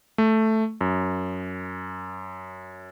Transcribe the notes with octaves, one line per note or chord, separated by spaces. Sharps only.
A3
F#2